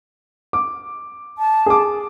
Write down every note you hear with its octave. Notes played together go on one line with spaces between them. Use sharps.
D6
A5
G#4 D6